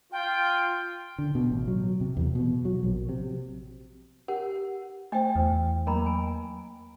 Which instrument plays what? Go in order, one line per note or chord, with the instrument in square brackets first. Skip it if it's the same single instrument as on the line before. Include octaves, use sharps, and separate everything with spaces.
[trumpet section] F4 [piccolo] G5
[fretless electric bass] D3
B2
A1
F#3
C3
E2
B2
F#3
A#1
C3
[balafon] G4 [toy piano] A#4 F#5
[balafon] A3 C5 [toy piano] D#5 G5 [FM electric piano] G#5
[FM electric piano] E2
[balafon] F#3 A#3 [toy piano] A#4 A#5 B5
[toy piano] G#5